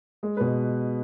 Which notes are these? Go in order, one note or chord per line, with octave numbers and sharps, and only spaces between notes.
G#3
B2 B4